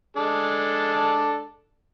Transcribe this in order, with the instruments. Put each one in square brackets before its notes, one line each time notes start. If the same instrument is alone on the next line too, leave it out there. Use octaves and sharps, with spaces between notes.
[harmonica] G#3 D4 A4